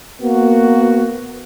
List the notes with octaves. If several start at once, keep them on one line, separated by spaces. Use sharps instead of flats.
A#3 B3 F#4